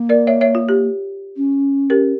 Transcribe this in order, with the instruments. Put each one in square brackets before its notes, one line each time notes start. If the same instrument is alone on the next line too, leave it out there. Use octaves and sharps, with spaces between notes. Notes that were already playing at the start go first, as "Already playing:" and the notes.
Already playing: [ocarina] A#3
[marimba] A#4 D5
C#5 E5
C#5 E5
F4
G4
[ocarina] C#4
[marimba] G4 A#4